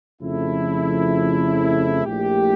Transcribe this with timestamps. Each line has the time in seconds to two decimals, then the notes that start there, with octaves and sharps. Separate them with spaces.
0.20 F2 C#3 F3 A3 E4
2.05 A#1 A#2 A3 E4 G4